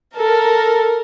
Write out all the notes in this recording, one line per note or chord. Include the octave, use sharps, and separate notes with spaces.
A4 A#4